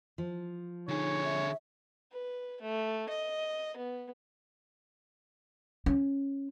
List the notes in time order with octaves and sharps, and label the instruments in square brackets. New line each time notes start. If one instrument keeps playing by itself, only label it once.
[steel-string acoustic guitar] F3
[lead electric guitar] D3 G#4 [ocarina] D#4 [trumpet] C#5
[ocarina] E5
[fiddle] B4
A3
D#5
B3
[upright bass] C#4